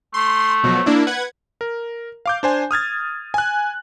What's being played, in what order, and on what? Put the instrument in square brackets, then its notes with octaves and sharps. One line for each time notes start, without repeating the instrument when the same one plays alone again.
[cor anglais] A3 [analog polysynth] C6
[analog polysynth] B2 F3 F#3
A#3 D4 E4
B4 F#5 G#6
[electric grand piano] A#4
F5 D6 G6
D4 C5 G#5
D#6 F6 G#6 A6
G#5 F#6